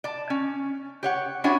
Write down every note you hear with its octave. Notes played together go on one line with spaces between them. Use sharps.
D5 A5
C#4
G4 C#5 F#5
C#4 D4 E4 F#4 C#5 G#5